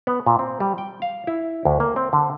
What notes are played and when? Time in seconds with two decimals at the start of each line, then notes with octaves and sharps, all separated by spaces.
0.07 B3
0.26 A#2
0.39 C4
0.60 G3
0.78 G5
1.02 F5
1.27 E4
1.65 D2
1.80 A#3
1.96 C4
2.13 D3